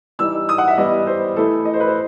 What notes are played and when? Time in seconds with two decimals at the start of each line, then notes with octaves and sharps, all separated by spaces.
0.19 E3 G3 D#4 E6
0.49 D#6
0.58 F#5
0.68 E5
0.78 E3 G3 B3 E4 D#5
1.07 C5
1.36 E3 A3 E4 A4
1.65 D#5
1.74 C5
1.80 B4
1.88 C5